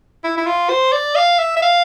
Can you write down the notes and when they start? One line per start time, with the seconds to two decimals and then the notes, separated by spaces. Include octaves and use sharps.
0.24 E4
0.37 E4
0.46 F4
0.70 C5
0.92 D5
1.16 F5
1.39 E5
1.56 E5
1.62 F5